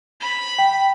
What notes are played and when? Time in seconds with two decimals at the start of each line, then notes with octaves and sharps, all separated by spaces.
0.20 B5
0.59 G5